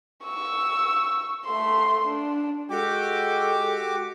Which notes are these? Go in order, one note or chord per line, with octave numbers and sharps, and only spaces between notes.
C#6 E6
A3 C6
D4
G#3 F#4 G4 A4 G5 D6